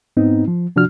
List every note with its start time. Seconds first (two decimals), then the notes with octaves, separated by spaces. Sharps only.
0.17 G#2 B3 C4 D#4
0.48 F3
0.76 C3 F3 D4 F#4 F6